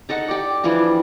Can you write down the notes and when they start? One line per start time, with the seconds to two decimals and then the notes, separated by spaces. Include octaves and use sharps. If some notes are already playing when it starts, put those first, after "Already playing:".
0.09 D#4 A4 D#5 F#5
0.28 G4 D5
0.64 E3 F3 G3 D4